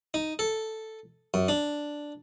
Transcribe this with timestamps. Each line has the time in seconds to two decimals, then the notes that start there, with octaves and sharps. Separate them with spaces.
0.14 D#4
0.39 A4
1.34 F#2
1.49 D4